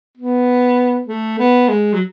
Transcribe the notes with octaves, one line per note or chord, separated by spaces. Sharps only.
B3
A3
B3
G#3
F#3